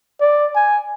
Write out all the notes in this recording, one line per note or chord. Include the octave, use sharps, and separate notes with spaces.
D5
G#5